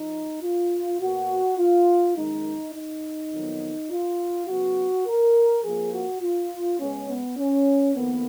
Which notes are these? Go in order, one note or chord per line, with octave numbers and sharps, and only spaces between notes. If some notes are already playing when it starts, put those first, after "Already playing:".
Already playing: F3 D#4
F4
B2 A#3 F#4
F4
F#2 D#3 G#3 D#4
D#4
F2 D#3 F#3 B3
F4
C#3 F#3 B3 F#4
A#4
F2 F3 A#3 G#4
F#4
F4
C#3 G#3 B3 C#4
B3
C#4
F2 D#3 A#3 B3